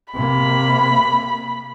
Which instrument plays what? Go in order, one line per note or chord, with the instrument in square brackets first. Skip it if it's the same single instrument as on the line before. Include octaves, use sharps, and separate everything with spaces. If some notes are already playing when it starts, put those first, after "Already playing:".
[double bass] C3 A#3 [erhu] B5